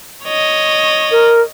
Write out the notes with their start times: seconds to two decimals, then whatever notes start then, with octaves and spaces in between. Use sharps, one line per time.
0.24 C#5 D#5
1.11 A#4